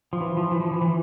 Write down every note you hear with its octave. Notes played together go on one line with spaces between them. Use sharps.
F3
E3
F3
E3
F3
E3
E3